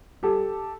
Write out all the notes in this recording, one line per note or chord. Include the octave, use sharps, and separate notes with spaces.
G3 G4 A4